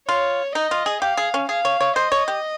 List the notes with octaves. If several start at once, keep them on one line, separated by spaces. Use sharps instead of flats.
F4 C#5
D#4 D#5
F4
G#4
G4 F5
G#4
C#4
G#4 F5
C#5
C#5
C5 D#5
C#5
G4